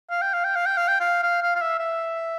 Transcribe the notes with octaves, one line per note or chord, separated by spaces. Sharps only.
F5
G5
F5
G5
F5
G5
F5
G5
F5
F5
F5
F5
E5
E5